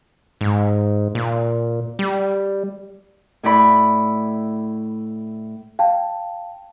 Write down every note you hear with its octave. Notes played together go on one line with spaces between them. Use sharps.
G#2
A#2
G3
A2 E4 D5 B5
F5 G5 A5